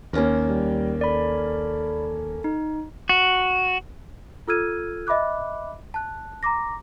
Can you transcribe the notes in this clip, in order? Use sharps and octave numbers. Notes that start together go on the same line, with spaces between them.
D#2 A#3 C#4 A#4
G3
A4 D5 B5
D#4
F#4
F4 A4 E6 F6 G#6 D#7
D#5 E5 B5 D6 F#6
A5 F#6
A#5 C6 D6 A#6